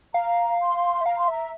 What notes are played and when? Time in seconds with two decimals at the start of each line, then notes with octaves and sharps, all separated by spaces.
0.14 F5 A#5
0.61 C6
1.01 E5
1.05 F5 A#5
1.18 C6
1.28 E5 A#5